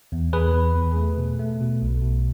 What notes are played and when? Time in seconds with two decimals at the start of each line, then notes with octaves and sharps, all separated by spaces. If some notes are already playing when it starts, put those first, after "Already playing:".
0.12 E2
0.33 E2 G#4 B4
0.54 E2
0.75 E2
0.97 A3
1.18 B2
1.39 A3
1.60 B2
1.82 B1
2.02 B2